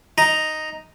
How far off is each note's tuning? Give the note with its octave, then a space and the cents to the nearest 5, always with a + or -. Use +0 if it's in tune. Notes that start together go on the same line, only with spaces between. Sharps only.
D#4 +0 A#5 +0